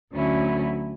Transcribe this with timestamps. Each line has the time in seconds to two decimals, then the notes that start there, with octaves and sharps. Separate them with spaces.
0.12 D2 D3 F#3 C#4 E4